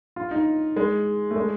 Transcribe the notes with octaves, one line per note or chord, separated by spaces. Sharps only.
F4
D#4
G#3
A3
G#3